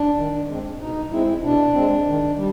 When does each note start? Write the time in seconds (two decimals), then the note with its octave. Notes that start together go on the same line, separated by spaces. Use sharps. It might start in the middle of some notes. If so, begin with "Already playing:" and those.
Already playing: D4
0.17 D#3
0.48 G#3 C4
0.80 B2 D#4
1.11 G#3 C4 E4
1.43 B2 D4
1.74 G#3 C4
2.06 D#3
2.37 G3